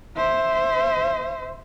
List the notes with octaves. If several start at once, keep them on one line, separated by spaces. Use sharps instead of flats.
C5 E5